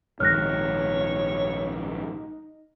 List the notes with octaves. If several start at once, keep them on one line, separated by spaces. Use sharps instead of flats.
A#1 G#2 D#3 D#4 C#5 F6 F#6 A#6